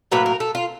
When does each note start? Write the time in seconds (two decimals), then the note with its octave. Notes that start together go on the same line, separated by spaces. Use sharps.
0.12 A2 F#3 A#3 B4
0.26 A#4
0.40 A4
0.55 F4